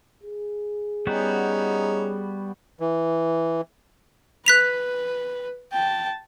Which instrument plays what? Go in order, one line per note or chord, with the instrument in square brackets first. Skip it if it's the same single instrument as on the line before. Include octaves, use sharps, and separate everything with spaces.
[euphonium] G#4
[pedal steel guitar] G3 B3 F#4 [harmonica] C#4 D#4
[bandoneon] E3
[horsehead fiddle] B4 [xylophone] F#6 B6 F7
[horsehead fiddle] G5 A5